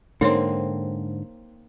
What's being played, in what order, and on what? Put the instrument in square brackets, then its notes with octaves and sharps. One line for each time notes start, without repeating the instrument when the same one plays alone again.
[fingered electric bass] G#2 D3 [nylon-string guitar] A#3 C4 [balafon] D#4 C#5 C6